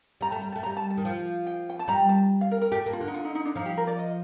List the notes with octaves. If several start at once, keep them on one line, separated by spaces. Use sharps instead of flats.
G3 A#5
A3 A5
G3 A#5
A5
A3
A#5
G3
A5
A5
D#3
F3
G5
G5
A5
G3 A#5
A5
F5
A#4
A#4
A3 G4
A#3
F4
D3
D#4
F4
D#4
D#4
D4
F3 D#4
G4
A#4
D5
D#5